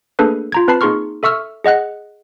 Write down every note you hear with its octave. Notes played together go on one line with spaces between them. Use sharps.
A3 A#3 D4 G#4 A4 B4
F4 A#5 G#6
C4 B4 A5 B5 C7
A#3 D#4 G#4 C6 C#6 F6
A4 E5 C#6 E6 F6
G#4 D#5 F#5 F#6